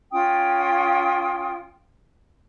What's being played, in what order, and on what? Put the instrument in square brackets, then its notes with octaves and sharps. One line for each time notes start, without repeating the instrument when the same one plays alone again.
[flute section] C#4 F4 G5 D#6